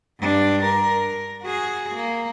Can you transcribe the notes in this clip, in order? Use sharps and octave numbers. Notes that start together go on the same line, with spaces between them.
G2 D4
A#4
F#4 G#4
A#3